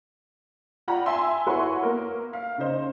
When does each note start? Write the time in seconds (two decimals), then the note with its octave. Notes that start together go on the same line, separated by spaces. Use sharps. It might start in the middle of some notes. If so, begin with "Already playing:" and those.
0.88 F4 D5 F#5 G5 A#5 B5
1.06 E5 G#5 A5 C6 E6
1.46 E4 F#4 B4 C#5 C6 C#6
1.82 A#3 A#4
2.33 F5
2.58 C#3 D#4 C5